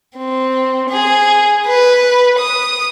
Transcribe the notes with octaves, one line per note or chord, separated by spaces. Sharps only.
C4
G#4
B4
D#6